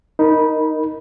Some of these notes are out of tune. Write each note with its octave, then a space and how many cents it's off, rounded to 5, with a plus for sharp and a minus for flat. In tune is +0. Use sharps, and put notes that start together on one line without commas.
D#4 +0 A#4 +0 B5 -15